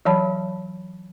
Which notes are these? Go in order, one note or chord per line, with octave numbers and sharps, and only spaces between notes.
E3 F#3 C#5 A5 B5